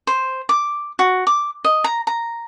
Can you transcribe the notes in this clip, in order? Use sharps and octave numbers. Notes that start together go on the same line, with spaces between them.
C5
D6
F#4
D6
D#5
A#5
A#5